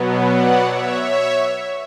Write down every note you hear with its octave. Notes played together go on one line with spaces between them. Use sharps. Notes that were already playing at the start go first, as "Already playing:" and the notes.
Already playing: B2 F#3 B3
D5 F#5
C#5 E5
C#5 E5